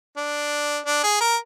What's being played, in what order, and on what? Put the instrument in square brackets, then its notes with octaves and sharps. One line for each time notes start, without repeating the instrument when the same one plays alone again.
[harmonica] D4
D4
G#4
A#4